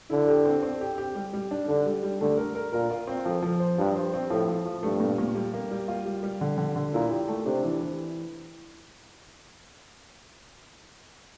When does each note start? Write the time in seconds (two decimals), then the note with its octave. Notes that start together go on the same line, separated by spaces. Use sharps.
0.10 D3 E4
0.28 G4
0.45 C4
0.63 C4
0.81 G4
0.98 G4
1.15 G3
1.33 G3
1.51 D4
1.68 D3 D4
1.86 G3
2.03 G3
2.21 D3 A3
2.37 A#4
2.55 A#4
2.73 A#2 A#4
2.91 F4
3.07 C4
3.25 F2 F3
3.42 F3
3.60 C5
3.78 G2 F3
3.96 C5
4.14 C4
4.30 A2 F3
4.48 F3
4.66 F3
4.83 G2 A3
5.00 A#2
5.18 A#2
5.35 G3
5.54 A#3
5.71 G3
5.88 F4
6.06 G3
6.23 G3
6.41 D3
6.58 D3
6.76 D3
6.93 A#2 E4
7.11 G4
7.28 A3
7.46 C3 D4
7.63 E3
7.81 E3